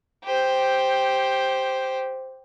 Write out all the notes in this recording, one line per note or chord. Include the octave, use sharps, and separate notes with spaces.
G4 C5